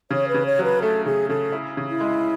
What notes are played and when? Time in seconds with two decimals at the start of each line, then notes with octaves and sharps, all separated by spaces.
0.11 C#3 C#5
0.28 B4
0.34 C#3
0.46 C#5
0.59 F#3 B4
0.82 A3 A4
1.05 C#3 G#4
1.29 C#3 A4
1.52 E4
1.77 C#3
1.89 E4
2.00 G#3